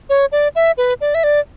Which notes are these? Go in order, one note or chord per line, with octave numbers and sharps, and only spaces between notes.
C#5
D5
E5
B4
D5
E5
D5